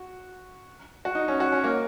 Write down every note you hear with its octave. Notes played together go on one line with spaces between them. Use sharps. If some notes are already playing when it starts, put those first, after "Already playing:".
Already playing: F#4
F#4
D#4
C#4
F#4
C#4
A#3